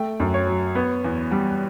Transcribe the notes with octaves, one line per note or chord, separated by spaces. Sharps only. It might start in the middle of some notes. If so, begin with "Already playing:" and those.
Already playing: A3 G5
F#2
C#5
F#3
B3
E2
G3